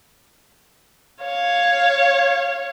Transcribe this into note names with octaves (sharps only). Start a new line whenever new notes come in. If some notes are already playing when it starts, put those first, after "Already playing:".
C#5 F5